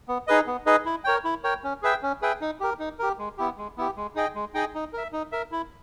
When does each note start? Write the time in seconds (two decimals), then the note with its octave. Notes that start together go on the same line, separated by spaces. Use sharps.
0.08 B3
0.27 D#4 G#4 B4 D#5
0.47 B3
0.66 D#4 G#4 B4 D#5
0.86 E4
1.04 A#4 C#5 G5
1.24 E4
1.44 A#4 C#5 G5
1.63 C#4
1.82 G#4 B4 E5 G5
2.02 C#4
2.22 G#4 B4 E5 G5
2.41 D#4
2.60 G4 A#4
2.79 D#4
2.99 G4 A#4
3.19 G#3
3.38 B3 E4 G4
3.58 G#3
3.77 B3 E4 G4
3.97 G#3
4.15 D#4 G#4 D#5 G5
4.35 G#3
4.54 D#4 G#4 D#5 G5
4.75 D#4
4.93 A#4 E5
5.13 D#4
5.32 A#4 E5
5.52 E4